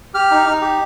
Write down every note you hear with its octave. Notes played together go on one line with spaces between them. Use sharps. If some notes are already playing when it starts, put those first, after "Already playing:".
G4 F6
D#4
D#4
G4